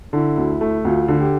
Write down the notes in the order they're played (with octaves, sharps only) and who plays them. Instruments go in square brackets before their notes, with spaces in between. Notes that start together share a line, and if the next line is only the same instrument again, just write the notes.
[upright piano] D3 [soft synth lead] E4
[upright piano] D2
A3
[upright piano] D2 [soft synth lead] F4
[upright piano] D3
[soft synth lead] G4